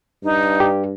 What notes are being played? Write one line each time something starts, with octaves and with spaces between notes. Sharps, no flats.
G2 D#4
G4